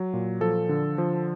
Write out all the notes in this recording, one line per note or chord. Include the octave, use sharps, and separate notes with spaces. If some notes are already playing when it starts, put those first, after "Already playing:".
Already playing: F#3
A#2
F3 A4
D3
F3